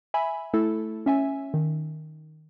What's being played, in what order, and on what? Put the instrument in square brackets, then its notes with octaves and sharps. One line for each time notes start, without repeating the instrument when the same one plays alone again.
[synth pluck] E5 G#5 B5
A3 E4 A4
C#4 E5 G#5
D#3